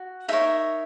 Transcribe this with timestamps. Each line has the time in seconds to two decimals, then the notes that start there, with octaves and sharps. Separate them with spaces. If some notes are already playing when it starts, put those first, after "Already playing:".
Already playing: F#4
0.28 D#4 A#4 C#5 E5